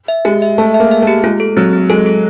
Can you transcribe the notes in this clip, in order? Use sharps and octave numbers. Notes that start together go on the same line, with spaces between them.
E5
G#3 G4
E5
A3 A5
E5
A#3
E5
A3
G4
G#3 F4
A4
F#3 C4
C4
G#3 A4
A4